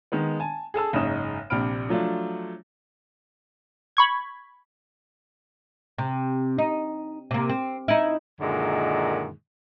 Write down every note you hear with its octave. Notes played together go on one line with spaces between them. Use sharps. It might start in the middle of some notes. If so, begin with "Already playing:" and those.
D#3 G#3 B3
G#5 A5
G#4 A4 A5 E6
F#1 G#2 C#4 D#4 D#6 E7
A#1 C3 D4 B5 F6 D7
F3 F#3 A3 D4 F4
B5 C#6 G#6
C3
D#4
C3 A#3
C4
D#4 E4
F#2 A#2 D3 D#3 G#3